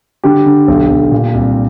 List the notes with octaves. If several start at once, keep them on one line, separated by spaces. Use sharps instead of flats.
D3 G4
D3
B1
B1
A#2
C2